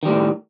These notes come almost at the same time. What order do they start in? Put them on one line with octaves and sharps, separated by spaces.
D#3 G3 A2